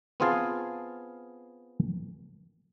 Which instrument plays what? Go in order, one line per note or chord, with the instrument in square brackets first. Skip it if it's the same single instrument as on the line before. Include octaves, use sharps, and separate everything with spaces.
[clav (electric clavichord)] B3 C4 F4 G#4 F5 A5